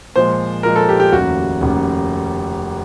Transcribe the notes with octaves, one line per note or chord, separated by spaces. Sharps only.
A#2 F3 G#3 C5
A#2 F3 G#3 A#4
A4
G4
G4
F1 D#2 C#3 F#4
F1 D#2 C#3